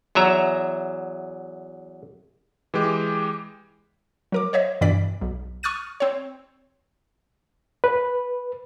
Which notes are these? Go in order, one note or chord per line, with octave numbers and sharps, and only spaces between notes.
E2 F#3 E5 A#5
E3 G#3 G4
F#3 A#4 D6
C5 C#5 D#5 E5
G2 B2 E3 D5 B6
B1
C#6 D#6 F6 F#6 A6 D#7
C4 C#5
B4